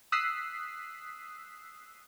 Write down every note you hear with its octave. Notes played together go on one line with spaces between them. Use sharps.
D#6 E6 F#6 B6 C7